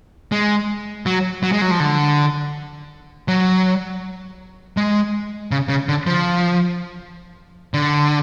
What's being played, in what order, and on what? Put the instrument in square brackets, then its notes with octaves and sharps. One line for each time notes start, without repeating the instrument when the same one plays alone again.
[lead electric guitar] G#3
F#3
F#3
G#3
F#3
F3
D3
F#3
G#3
C#3
C#3
D3
F3
D3